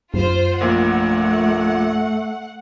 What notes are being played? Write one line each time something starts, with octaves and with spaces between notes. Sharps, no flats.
F#2 F4 C5
A#1 A#2 A3 F#5